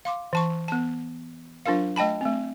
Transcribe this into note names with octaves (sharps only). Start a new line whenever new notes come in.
F5 C6 D6
E3 A5 C#6
B3 A5
F#3 D4 F4 A#4 F5
A3 D#5 G5 A5 B5
A3 C4